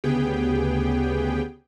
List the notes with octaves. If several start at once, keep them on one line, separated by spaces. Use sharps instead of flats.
D2 C#3 B3 G4 G#4 G5